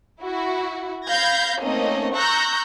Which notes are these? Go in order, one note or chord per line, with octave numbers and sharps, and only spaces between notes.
E4 F#4
F5 B5 G6 G#6 A#6
A3 A#3 C4 C#4 D#4 D#5
A#5 C#6 E6 F#6 G6 A#6